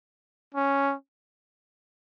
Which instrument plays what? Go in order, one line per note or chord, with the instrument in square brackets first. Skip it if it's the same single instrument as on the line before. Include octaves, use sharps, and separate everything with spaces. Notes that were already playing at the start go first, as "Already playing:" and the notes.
[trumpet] C#4